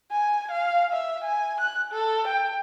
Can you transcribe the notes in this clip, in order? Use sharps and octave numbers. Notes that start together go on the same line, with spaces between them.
G#5
F5
E5
G#5
F#6
A4
G5